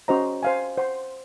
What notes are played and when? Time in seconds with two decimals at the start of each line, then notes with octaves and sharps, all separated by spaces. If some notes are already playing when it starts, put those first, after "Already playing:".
0.08 C#4 F#4 C5 D#5 A#5
0.43 C5 F5 G#5
0.78 C5 F#5 C6